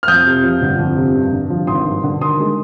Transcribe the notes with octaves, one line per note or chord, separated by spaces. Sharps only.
F6
F2 D#6 G6
C3
F3
G1
F2
C3
G2
D3
F3
G#1 C6 D#6
G2
D3
D#3 C6 D#6
G#3